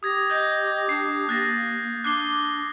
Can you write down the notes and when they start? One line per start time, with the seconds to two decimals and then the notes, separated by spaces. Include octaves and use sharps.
0.03 G4 D#6 G#6 A#6
0.30 D#5 G6
0.89 D4 C7
1.29 A#3 F#6 A6 A#6
2.04 D4 D6 F#6 C7 G7